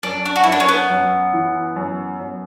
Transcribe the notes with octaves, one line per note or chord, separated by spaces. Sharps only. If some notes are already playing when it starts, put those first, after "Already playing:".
F#2 D4
D4
F#4
F#2 E4
D4
C#4
B3
F#2
E3
F#2
F#2